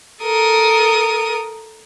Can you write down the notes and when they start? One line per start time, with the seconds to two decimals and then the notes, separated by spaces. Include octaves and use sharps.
0.22 A4 A#4 D#6